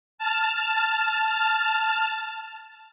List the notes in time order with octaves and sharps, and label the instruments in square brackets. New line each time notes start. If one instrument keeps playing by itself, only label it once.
[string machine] A5 F6